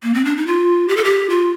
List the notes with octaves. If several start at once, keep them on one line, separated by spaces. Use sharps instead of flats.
A#3
C4
D4
D#4
F4
G4
A4
G4
F4